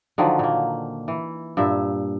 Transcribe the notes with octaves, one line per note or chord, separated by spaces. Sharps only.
D3 D#3 F3 F#3
A#2 A#3
E3
G2 A#2 E5